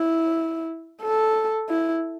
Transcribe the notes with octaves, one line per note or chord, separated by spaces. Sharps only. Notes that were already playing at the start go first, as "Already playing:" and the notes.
Already playing: E4
A4
E4